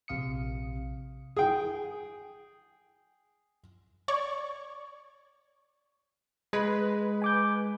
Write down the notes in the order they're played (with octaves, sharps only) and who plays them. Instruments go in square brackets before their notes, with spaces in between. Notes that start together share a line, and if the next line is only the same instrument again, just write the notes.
[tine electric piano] A#1 C3 F5 D#6 C#7
[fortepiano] G#4 G5
[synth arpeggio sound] C#5 D5 C#6
[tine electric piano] G#3 [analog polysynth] B4 [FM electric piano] B5
[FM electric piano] G#5 D6 G6